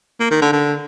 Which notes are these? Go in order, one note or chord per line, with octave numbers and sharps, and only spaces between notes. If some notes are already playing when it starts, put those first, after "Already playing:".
A#3
D#3
D3
D3